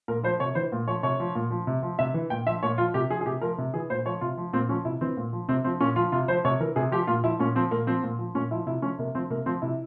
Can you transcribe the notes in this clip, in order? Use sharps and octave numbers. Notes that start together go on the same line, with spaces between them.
A#2 A#4
F3 C5
C3 C#5
E3 C5
A#2
F3 C#5
C3 C#5
F3
A#2
F3
C3
F3
C3 E5
E3
A#2 G5
F3 E5
A#2 C#5
F3 F4
C3 G4
F3 G#4
G#4
C3 G4
F3 A#4
C3
E3 G#4
A#2 C5
F3 C#5
C3 F4
F3
A#2 C4
F3 C#4
C3 E4
E3 C4
A#2
F3
C3 C4
F3 C4
A#2 C#4
F3 F4
C3 F4
F3 C5
C3 C#5
E3 A#4
C3 G#4
F3 G4
A#2 F4
F3 E4
A#2 C#4
F3 C4
A#2 A#3
F3 C4
A#2
F3
A#2 C#4
F3 E4
C3 E4
F3 C#4
C3 A#3
F3 C4
C3 A#3
F3 C4
C3 E4